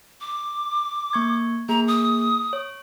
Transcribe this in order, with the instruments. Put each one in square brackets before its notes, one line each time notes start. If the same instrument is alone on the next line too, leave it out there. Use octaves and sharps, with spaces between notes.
[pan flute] D6
[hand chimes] A#3 C#6 G#6
[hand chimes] A#3 G#4 [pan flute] A#5
[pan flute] D#6
[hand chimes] C#5